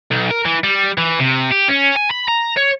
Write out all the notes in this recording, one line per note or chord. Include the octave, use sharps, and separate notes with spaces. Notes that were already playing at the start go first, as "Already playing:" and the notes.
B1
A#4
E3
G3
E3
C3
G4
C#4
G#5
B5
A#5
C#5